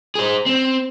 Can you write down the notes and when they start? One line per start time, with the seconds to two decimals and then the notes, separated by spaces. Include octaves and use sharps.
0.15 G#4 C5
0.46 C4